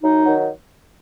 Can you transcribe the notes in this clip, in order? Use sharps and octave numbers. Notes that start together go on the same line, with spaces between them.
F#2 D#4
D#3 F#3